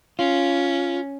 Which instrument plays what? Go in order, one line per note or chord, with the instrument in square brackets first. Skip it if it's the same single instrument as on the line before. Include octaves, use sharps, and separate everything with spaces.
[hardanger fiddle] C#4 [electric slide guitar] F4